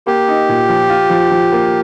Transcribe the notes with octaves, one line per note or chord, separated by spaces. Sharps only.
A#3 G4
D#4
A#2
F3
F4
F3
F3
A#3